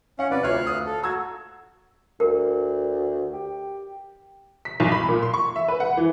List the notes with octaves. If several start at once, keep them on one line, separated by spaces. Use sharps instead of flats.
C#4 F5 F#5 C#7
C3 B4 D5
D2 F4 C#5 E5 F5 F#6
D#6
A4
F#4 A#5 E6 G#6
D2 A#4
G4
B6
B1
B5
A#2
C6
C#6
E5
B4
F#5
E3